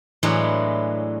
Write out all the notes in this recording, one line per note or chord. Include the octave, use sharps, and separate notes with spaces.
A2 E3 F#3 G#3 B3 D4